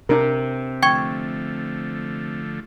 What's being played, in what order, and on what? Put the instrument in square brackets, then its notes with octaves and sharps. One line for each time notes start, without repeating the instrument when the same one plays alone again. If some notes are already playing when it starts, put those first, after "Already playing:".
[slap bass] C3 [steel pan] D4 A#4
[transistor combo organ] D3 F3 A3 [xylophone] G5 C#6 G#6